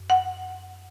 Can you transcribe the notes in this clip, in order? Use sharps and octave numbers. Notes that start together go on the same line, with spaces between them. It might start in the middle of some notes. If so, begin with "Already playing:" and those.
Already playing: F#2
F#5